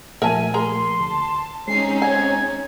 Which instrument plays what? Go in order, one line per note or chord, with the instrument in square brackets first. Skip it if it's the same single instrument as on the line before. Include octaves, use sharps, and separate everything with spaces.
[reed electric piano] A#2 F3 A3 [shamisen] A#4 E5 A5 [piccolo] G#5
[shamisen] G#4 A#4 A#5 [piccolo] C6
[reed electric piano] D2 [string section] A5
[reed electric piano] G#3 G#4 [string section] C4 C#4 D#4 [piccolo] C7
[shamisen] G#5 [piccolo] G#6